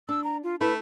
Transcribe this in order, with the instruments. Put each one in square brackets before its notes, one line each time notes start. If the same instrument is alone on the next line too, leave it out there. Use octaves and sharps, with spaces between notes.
[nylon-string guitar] D4 [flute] E6
[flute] A#5
F4
[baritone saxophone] A3 [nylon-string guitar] E4 [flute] B4